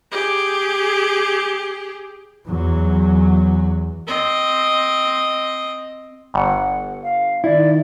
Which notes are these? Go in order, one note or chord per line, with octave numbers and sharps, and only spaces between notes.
G4 G#4
E2 F#3
C4 D#5
G1 F#5
F5
D#3 E4 D5